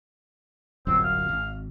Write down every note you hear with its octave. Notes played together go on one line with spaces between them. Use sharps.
D1 G1 F#2 C4
F5
G#1